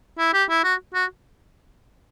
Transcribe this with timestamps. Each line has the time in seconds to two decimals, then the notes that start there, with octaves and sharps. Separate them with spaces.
0.19 E4
0.34 G4
0.49 E4
0.64 F#4
0.94 F#4